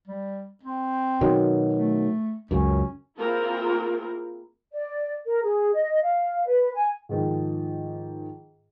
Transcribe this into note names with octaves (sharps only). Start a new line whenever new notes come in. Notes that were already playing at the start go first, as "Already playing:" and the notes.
G3
C4
B2 D#3 F#3
A3
C#2 F#2 C#4
A#3 C4 E4 F4 G#4 A#4
D5
A#4
G#4
D#5
F5
B4
G#5
G#2 D#3 F3